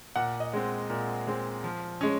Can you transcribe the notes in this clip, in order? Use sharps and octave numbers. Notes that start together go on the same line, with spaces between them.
A#2 F#5
D#5
G#3 C4
A#2
G#3 C4
F3
G#3 C#4